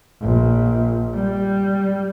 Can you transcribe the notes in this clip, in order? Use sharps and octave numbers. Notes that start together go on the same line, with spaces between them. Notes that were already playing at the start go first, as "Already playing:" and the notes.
A#1
G3